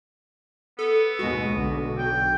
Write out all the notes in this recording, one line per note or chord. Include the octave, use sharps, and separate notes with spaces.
B3 A4
D#2 B2 G#3 F#4
B1 D3
G5